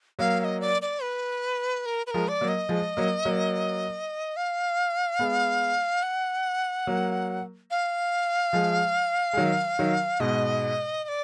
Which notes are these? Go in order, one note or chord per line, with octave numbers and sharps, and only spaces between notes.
F#3 A#3 F5
F5
D#5
D5
D5
B4
A#4
B4
F3 G#3 A#4
D5
F#3 A#3
D#5
F3 G#3
F#3 A#3
F#3 A#3
F5
G#3 B3
F#5
F#3 A#3
F5
F3 G#3
G#3
D#3 F#3
D#3 F#3
G#2 B2 D#5
D#5
D5